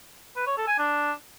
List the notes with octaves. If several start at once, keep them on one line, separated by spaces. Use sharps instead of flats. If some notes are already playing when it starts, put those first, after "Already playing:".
B4
C#5
A4
G#5
D4